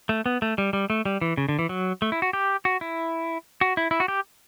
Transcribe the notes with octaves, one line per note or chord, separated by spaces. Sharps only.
A3
B3
A3
G3
G3
A3
G3
E3
C#3
D3
E3
F#3
A3
E4
F#4
G4
F#4
E4
F#4
E4
E4
F#4
G4